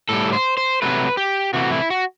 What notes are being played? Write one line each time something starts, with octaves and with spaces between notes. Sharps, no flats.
A2 G3 A4
C5
C5
C3 F#3 A3 B4
G4
C3 E3 A3 F#4
E4
F#4